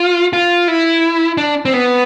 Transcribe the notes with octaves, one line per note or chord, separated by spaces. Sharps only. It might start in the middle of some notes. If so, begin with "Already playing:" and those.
Already playing: F4
F4
E4
D4
C4
B3